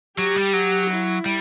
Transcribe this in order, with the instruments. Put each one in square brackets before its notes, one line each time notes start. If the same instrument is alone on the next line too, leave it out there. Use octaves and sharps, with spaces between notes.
[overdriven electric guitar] F#3 [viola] G4
[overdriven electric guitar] G3
F#3
[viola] E4
[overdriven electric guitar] G3